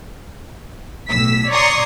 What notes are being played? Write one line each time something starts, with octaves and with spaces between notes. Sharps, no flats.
B1 A2 E6 B6
C#5 D5 A#5 C6 C#6 D#6